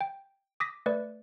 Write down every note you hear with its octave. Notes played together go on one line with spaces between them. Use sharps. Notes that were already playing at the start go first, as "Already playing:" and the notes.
G5
D6 D#6 A#6 B6
A3 B4 D5